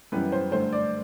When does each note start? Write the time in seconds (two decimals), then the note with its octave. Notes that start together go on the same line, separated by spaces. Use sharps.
0.12 F#2 E3 G3 B3 B4
0.32 C5
0.52 G2 D3 A3 C5
0.73 D5